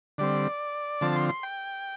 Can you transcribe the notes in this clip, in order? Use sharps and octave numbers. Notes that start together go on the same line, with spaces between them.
D3 G3 C4 D5
D3 F3 C4 A5
C6
C6
G5